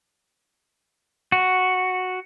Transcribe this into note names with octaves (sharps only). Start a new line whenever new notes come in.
F#4